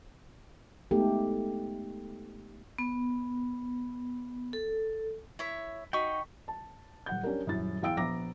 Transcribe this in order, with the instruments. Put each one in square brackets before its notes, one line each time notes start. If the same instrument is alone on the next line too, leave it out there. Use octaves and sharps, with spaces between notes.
[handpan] G#3 A3 B3 D#4 G4 A4
[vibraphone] B3
A4
[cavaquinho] E4 C#5 E5
[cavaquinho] D#4 F#4 B5 [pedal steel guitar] G5 C#6
[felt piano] A5
D#1 F#5 G6
C#4 D4 G4 A#4
D#1 F#2 E4 A6
E2 F5 G5 E6 D7
A#1 B3 A#5 D6 A#6